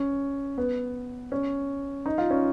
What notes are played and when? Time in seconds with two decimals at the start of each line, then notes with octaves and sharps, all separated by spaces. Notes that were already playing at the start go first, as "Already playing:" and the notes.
Already playing: C#4
0.58 B3
1.32 C#4
2.06 D#4
2.18 F4
2.30 C#4